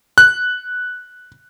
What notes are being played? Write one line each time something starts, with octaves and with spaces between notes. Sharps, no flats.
F#6